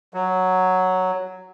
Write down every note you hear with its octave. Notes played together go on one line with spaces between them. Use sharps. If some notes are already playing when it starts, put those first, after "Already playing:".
F#3